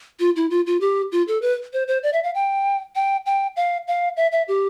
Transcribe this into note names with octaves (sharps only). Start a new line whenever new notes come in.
F4
E4
F4
F4
G4
F4
A4
B4
C5
C5
D5
E5
F5
G5
G5
G5
F5
F5
E5
E5
G4